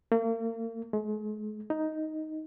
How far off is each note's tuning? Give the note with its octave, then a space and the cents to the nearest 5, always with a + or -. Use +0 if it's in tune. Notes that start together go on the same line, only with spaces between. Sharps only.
A#3 -40
G#3 +40
D#4 +5